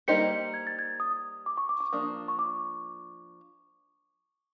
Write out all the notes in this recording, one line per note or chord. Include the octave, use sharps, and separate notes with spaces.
G3 A#3 D#4 G4 C5 C#7
G#6
A6
G#6
D#6
D6
C#6
D6
D6
F3 A#3 D4 D#6
C#6
D6